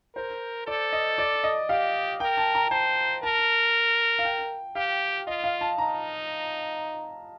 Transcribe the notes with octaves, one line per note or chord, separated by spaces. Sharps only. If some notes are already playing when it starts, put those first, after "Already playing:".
A#4 C5
A4 D5
D#5
D5
D#5
G4 F5
A#4 G5
A5
A#5
C5 A5
A#4 A5
F5
G5
G4 F5
F4 D#5
F5
A5
D#4 A#5